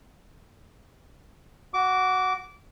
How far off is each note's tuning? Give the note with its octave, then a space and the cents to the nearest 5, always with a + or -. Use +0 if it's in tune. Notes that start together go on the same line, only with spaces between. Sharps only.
F#4 +0 D6 -20